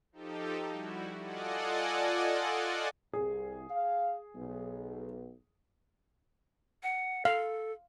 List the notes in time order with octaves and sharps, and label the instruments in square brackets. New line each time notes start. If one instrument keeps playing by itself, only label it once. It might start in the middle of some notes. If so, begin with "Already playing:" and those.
[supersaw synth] F3 D#4 G4 A4
G3 E4 F#4
F4 A4 D5 D#5 F#5 G#5
[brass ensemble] C2 [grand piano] G#4
[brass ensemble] F5
B1
[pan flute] F#5
[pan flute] A4 [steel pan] F5